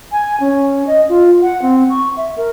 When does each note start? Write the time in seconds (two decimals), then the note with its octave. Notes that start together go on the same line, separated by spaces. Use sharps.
0.12 G#5
0.41 C#4
0.87 D#5
1.09 F4
1.42 F#5
1.62 C4
1.90 C#6
2.17 E5
2.37 A#4